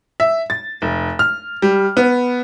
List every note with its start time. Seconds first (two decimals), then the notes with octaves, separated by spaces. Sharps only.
0.20 E5
0.50 A6
0.82 F1
1.19 F6
1.62 G3
1.97 B3